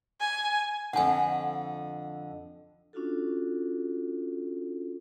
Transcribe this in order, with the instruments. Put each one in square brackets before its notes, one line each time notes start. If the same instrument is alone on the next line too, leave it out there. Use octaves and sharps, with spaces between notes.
[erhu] G#5
[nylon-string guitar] F2 D3 [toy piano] F#5 G#5
[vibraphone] C#4 D4 F4 F#4 A4